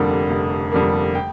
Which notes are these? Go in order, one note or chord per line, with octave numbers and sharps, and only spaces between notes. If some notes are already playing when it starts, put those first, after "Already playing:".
Already playing: F1 F2 D3 G3 A#3
F1
F2 D3 G3 A#3
G5